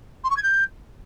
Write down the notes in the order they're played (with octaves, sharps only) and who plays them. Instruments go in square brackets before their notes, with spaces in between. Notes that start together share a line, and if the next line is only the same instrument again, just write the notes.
[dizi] C6
C#6
G#6
G6